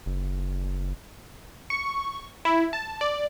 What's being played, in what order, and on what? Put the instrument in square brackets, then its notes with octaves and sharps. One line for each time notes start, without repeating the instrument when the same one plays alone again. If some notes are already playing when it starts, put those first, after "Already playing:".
[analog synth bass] F#1
[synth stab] C#6
E4
A5
D5